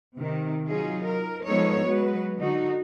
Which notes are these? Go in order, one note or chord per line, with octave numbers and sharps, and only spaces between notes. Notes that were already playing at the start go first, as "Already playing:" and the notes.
C3 D#3
F#3 D#4 F4 G#4
A#4
F3 G#3 B3 D#4 A4 C#5
F#3 G#3 F#4 B4
D3 D#4 F#4